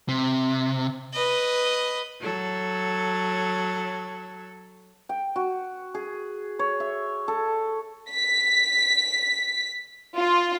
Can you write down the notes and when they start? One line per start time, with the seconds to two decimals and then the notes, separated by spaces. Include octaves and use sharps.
0.09 C3
1.13 B4 D#5
2.20 F#3 A4
5.09 G5
5.36 F#4
5.94 G#4
6.59 C#5
6.80 E5
7.28 A4
8.10 B6
10.17 F4